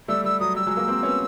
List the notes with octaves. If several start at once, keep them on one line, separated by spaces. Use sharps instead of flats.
G3 A3 E6
G3 E6
F#3 D#6
G3 E6
F#3 G#3
G#3 A#3
A#3 C4
B3 C#4